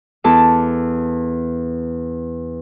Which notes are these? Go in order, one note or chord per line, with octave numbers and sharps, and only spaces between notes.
E2 E4 A4 A5 D6